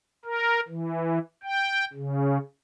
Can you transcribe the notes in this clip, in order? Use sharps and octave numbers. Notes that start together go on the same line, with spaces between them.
A#4
E3
G5
C#3